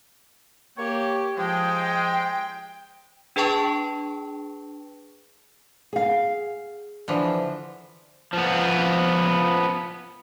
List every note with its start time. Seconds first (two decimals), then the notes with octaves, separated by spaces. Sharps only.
0.78 A#3 G4 C#5
1.38 F3 G#3 G5
3.36 D4 G#4 B4 G5 A5 C#6
5.93 G#4 F5
7.08 D3 E3 F3
8.33 F3 B3